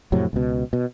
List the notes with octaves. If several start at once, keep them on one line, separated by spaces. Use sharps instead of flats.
F2 A2 C3 F#3
C#2 B2
B2